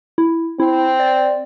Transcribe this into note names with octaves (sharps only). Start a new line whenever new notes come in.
E4
C4 E4
D5